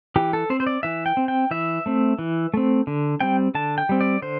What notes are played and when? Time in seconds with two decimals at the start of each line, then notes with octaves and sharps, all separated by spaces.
0.16 E3 G4
0.33 A4
0.50 C4 C5
0.60 C5
0.67 D5
0.83 E3 E5
1.06 G5
1.17 C4
1.28 G5
1.51 E3 E5
1.86 A3 C4
2.19 E3
2.54 A3 C4
2.87 D3
3.20 G3 C4 G5
3.55 D3 A5
3.78 G5
3.89 G3 C4
4.01 D5
4.22 D3 C5